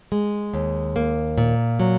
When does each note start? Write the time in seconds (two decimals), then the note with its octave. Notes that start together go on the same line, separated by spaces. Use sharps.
0.12 G#3
0.54 D#2
0.96 A#3
1.38 A#2
1.80 F#3